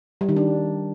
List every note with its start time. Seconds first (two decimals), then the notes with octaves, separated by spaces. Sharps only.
0.21 G3
0.29 D#3
0.36 D4